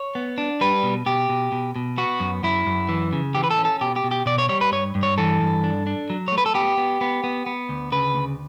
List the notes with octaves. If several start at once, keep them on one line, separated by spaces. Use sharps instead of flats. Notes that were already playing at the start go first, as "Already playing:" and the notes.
Already playing: C#5
B3
D4
G3 B4
B2
B2 G4
B2
B2
B2
B3 F#4
F#2
F#2 E4
F#2
E3
C#3
E3 G4
B4
A4
C#4
A4
B2 G4
G4
B2
G4
B2 D5
C#5
G3 C#5
B4
G2 C#5
G2
C#5
E3 A4
G2
D4
D4
F#3
C#5
A3
B4
A4
B3 G4
B3
B3
B3
B3
D2
C#3 B4
D2